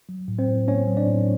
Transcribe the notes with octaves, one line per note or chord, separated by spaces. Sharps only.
F#3
A2
C4 C5
A2
A#3 C#4 C#5
F#3
D4 D5
A2